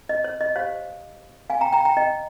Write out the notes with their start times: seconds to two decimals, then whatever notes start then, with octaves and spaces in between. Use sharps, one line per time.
0.09 D#5
0.24 C#5
0.41 D#5
0.56 G4 C5 C#5 F5
1.50 F5 G#5
1.61 G5 A#5
1.73 G5 A#5
1.85 G5 A#5
1.97 D#5 G5